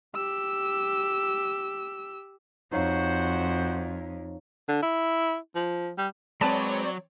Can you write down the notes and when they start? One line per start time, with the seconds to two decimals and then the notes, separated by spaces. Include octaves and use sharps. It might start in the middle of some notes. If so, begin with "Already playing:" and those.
0.15 G4 E6
2.73 F2 D#4 F#4 C5 C#5 F5
4.68 D3
4.82 E4
5.55 F3
5.98 G3
6.41 F#3 G#3 C4 B4 C#5 D5 A5